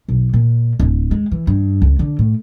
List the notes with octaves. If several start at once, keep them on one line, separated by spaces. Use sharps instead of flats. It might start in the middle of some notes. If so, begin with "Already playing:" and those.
B1
A#2
D1
G#3
E3
G2
C#2
D3
A2